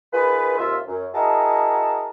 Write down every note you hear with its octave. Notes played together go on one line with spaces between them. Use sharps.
D#3 F4 G#4 B4
D#2 C3 F4 C5 E5
F#2
E4 F#4 G#4 A#4 D#5 A5